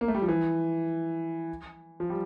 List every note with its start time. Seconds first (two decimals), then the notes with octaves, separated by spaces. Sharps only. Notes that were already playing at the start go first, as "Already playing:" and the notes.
0.01 A#3
0.08 A3
0.15 G3
0.22 F3
0.29 E3
2.00 F3
2.10 G3